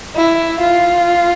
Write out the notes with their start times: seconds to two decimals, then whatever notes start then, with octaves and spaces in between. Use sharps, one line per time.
0.17 E4
0.61 F4